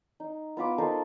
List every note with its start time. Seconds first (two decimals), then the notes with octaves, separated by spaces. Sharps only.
0.20 D#4
0.57 B3 F4 B5 D6
0.78 D#4 A4 A#4 C5